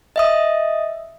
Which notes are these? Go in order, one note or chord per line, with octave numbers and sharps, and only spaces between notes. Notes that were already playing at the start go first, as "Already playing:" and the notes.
D#5 E5 D#6